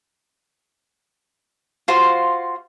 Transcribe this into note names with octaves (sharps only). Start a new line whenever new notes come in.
F4 F#4 C5 F5